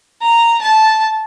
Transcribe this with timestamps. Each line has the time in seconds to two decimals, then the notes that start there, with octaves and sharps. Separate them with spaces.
0.22 A#5
0.62 A5